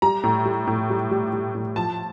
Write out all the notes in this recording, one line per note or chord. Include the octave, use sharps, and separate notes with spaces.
G3 A#5
A2
G3
A2
G3
G3
G3
A2
F3 A5